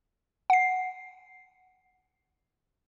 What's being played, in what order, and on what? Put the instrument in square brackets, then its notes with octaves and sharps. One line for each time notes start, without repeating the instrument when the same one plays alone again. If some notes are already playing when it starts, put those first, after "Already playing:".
[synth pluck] F#5 C7